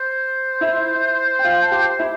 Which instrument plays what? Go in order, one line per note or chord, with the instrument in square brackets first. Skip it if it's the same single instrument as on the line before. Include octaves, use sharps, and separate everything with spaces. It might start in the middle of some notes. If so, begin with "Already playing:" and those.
Already playing: [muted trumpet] C5
[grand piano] E4 E5
G5
F4 F5
A5
G4 G5
E4 E5